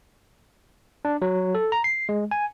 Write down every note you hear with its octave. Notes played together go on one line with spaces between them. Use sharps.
D4
F#3
A4
A#5
C7
G#3
G#5